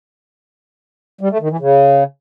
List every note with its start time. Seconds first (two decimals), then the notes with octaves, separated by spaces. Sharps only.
1.21 G3
1.31 A3
1.40 D#3
1.50 E3
1.60 C#3